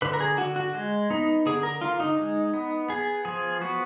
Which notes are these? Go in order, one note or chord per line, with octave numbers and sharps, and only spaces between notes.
D3 B4
A#4
G#4
D3 F#4
F#4
G#3
B3 D#4
D3 G#4
A#4
D3 F4
D#4
G#3
B3
B3 G#4
F3 G#4
B3 F#4